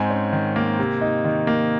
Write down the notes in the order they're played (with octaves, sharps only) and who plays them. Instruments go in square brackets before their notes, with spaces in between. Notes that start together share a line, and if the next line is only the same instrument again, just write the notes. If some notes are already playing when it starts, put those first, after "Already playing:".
Already playing: [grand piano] G#2 C4 G#5
C#4
D#3
A#3
C3
D#4
D#3
A#3